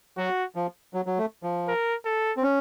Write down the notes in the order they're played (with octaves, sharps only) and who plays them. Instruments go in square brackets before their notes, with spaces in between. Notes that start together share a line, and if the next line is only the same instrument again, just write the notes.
[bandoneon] F#3 [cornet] F#4
[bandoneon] F3
F#3
F#3
A3
F3
[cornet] A#4
A4
[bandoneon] C4
C#4